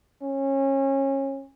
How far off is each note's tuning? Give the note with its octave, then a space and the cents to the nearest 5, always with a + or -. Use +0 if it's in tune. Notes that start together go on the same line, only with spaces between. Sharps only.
C#4 -25